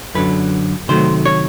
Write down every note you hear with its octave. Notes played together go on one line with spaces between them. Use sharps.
F#2 D3 F#3 B4
C3 D#3 F#3 A3 C5
C#5